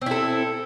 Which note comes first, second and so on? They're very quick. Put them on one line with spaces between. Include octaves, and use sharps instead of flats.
C4 E4 A4